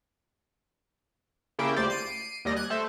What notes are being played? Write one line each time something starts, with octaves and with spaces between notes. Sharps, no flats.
C#3 A#3 E4 G4 G5
D2 G4 C5 D5
C7 D7 D#7
D#2 G3 D#5
F#6 G#6
A3 A4 C5